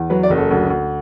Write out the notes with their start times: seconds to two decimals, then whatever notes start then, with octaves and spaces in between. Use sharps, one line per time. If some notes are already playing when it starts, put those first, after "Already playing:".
Already playing: E2
0.10 F#3 B4
0.23 D5
0.30 F#1
0.37 A4
0.51 D2
0.70 D2